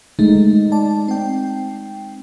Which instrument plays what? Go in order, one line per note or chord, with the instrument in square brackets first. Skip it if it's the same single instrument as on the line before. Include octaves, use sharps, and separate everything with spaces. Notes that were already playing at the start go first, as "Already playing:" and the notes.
[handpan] G#3 D#4 [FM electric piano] A3
[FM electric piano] D5 A5
C4 G5